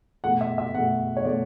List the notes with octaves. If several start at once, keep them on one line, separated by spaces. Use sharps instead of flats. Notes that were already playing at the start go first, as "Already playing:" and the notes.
B2 A3 F#5
E5
E5
B2 A3 F#5
C#5
B2 A3 D5